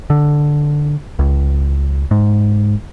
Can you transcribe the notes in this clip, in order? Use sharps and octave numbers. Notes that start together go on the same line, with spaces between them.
D3
C#2
G#2